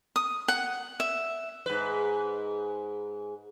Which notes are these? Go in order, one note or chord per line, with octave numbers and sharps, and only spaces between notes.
D#6
F#5
E5
G#2 B4